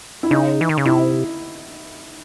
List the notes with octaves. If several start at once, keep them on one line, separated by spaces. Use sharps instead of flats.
E4
C#3 D#4
E3
D#3
C#3
C3 E4